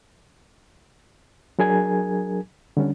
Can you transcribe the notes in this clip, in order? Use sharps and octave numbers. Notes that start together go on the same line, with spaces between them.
F#3 D4 G#4 A#4 G#5 G#6
D3 G3 C#4 D4